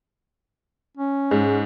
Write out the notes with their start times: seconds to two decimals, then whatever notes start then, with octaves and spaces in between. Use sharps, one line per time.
0.97 C#4
1.31 G#2